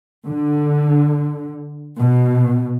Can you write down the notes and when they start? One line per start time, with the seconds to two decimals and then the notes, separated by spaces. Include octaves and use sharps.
0.27 D3
1.99 B2